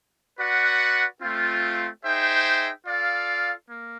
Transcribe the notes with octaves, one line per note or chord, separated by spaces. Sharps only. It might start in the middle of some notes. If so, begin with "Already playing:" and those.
F#4 B4 D5 F#5
A3 C4 F4
D#4 G#4 C5 E5 G5
F4 A4 D5 F5
A#3